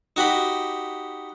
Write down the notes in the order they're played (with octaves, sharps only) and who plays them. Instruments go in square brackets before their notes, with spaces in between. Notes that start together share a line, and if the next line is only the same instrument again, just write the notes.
[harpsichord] D#4 F#4 G4 B5